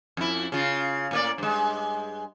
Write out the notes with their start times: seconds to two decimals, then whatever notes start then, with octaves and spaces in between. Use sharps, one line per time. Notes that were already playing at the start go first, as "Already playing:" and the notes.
0.17 F2 E4
0.52 C#3 F4
1.11 A2 A#3 D5
1.38 G2 G#3